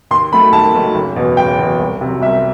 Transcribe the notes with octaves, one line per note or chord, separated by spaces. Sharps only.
D#2 C6
D#3 F#3 A3 B5
D#2 A5
D#3 F#3 A3
F#1
E2 B2
F#1 G5
E2 B2
C2
C3 F#3
C2 E5